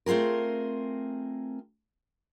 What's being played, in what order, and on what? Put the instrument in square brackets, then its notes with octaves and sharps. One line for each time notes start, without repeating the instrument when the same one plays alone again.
[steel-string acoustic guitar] A3 C4 F4 G#4 A#4